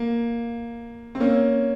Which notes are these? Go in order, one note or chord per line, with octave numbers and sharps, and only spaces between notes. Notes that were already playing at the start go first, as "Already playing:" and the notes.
Already playing: A#3
C4
A#3 C#4